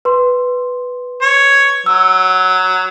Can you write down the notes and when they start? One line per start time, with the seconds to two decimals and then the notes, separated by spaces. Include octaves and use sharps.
0.05 B4 C6
1.22 C#5
1.86 F#3 E6